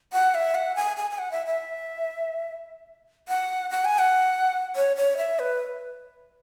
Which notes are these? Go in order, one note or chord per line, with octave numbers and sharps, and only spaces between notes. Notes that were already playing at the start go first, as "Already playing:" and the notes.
F#5
E5
F#5
G#5
G#5
G#5
F#5
E5
E5
F#5
F#5
G#5
F#5
C#5
C#5
E5
B4